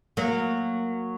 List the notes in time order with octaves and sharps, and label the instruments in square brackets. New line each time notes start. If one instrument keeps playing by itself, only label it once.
[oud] F#3 A#3